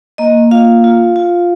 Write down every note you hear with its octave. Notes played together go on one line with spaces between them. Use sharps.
A#3 D#5
F4 F5
F4
F4